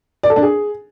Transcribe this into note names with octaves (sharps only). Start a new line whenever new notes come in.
D5
A4
D4
G#4